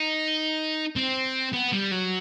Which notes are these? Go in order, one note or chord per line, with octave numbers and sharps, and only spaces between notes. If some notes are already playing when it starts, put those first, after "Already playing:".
Already playing: D#4
C4
B3
G3
F#3